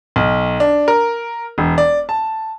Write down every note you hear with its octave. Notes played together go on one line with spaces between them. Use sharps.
B1
D4
A#4
E1
D5
A5